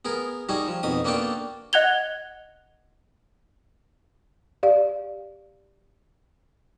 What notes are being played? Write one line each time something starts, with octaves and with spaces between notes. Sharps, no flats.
B3 G#4 A#4
G3 D#4 F#4 G#4
F3
F2 B2 D#4 D#6
A#3 B3 D4 F#4 A4 G5
D#5 F#5 F#6 G#6 F7 G7
G4 D5 F5